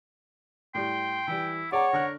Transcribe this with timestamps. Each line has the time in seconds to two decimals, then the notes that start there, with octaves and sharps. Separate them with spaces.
0.75 A2 G3 G5 C6
1.28 E3 G3 E4
1.72 G#4 C#5 D5 F#5 A#5
1.93 D3 A#4 C#6 F#6